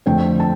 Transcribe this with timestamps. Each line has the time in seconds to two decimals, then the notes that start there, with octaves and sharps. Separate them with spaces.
0.06 F2 D3 A3 C4 G5
0.40 A5